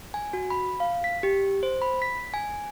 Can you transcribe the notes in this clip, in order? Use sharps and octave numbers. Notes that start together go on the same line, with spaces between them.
G#5
F#4
B5
F5
B6
G4
C5
B5
B6
G#5